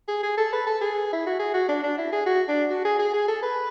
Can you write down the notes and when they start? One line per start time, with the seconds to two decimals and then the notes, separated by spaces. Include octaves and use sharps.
0.08 G#4
0.23 G#4
0.37 A4
0.53 B4
0.66 A4
0.81 G#4
1.13 E4
1.26 F#4
1.39 G#4
1.54 F#4
1.68 D4
1.83 D4
1.98 E4
2.12 G#4
2.26 F#4
2.48 D4
2.70 F#4
2.85 G#4
2.99 G#4
3.13 G#4
3.28 A4
3.42 B4